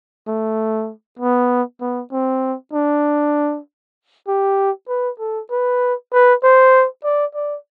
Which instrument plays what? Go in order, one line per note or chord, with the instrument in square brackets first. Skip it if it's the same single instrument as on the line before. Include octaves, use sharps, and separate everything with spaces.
[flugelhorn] A3
B3
B3
C4
D4
G4
B4
A4
B4
B4
C5
D5
D5